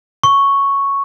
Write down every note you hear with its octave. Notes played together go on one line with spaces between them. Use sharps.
C#6